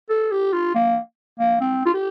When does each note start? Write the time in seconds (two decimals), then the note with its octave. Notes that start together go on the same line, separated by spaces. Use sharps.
0.09 A4
0.31 G4
0.53 F4
0.75 A#3
1.39 A#3
1.61 C4
1.85 F4
1.93 G4